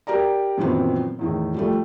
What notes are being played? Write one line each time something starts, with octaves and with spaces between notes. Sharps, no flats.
G4 A#4 D5 A#5
F#2 A#2 D#3 E3 B3 C4
E2 A2 D#3
F3 G3 A3